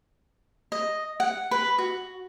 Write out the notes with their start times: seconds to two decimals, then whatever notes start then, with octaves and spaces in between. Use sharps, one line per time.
0.72 D#5
1.20 F#5
1.51 B4
1.78 F#4